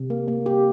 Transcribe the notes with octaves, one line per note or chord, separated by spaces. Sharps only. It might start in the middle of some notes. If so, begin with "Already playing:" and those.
Already playing: C3
A#3
A#3
G4